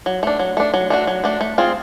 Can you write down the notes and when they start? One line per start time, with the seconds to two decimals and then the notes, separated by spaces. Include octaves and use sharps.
0.06 F#3
0.23 A3 D4
0.39 F#3
0.57 A3 D4
0.74 F#3
0.90 A3 D4 F#4
1.07 F#3
1.24 A3 D4 F#4
1.41 A3
1.58 C4 F4 G#4